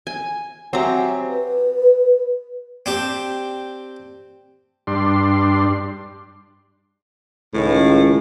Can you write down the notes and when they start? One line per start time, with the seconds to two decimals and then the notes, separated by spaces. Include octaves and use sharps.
0.07 G#5
0.73 F#3 C4 G4 E5 G#5 A#5
1.28 B4
2.86 C4 D4 G4
4.87 G2 D4 C6
7.54 C#2 A2 D#3